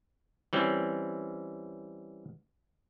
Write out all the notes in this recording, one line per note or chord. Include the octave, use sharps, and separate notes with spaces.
E3 G3 C4 C#4